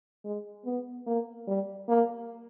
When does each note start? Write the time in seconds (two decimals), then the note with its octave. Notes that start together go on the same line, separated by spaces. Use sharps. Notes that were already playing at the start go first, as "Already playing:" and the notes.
0.25 G#3
0.65 B3
1.07 A#3
1.48 G3
1.89 A#3